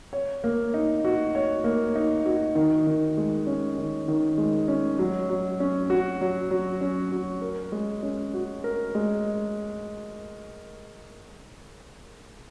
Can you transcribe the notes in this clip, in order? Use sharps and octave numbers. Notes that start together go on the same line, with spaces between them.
C#5
A#3
D#4
F#4
C#5
A#3
D#4
F#4
D#3
D#3
G#3
C#4
D#3
D#3
G#3
C#4
F#3
F#3
C#4
F#4
F#3
F#3
C#4
F#4
A#4
G#3
C#4
F#4
A#4
G#3